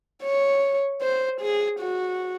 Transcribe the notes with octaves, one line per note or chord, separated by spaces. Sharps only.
C#5
C5
G#4
F#4